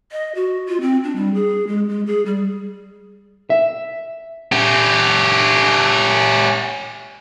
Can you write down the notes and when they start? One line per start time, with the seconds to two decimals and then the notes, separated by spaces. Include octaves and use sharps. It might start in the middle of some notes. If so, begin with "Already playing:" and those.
0.12 D#5
0.35 F#4
0.68 F4
0.81 C4
1.04 D4
1.16 G3
1.34 G#4
1.67 G#3
1.89 G#3
2.06 G#4
2.26 G3
3.50 E5
4.52 C#4 G4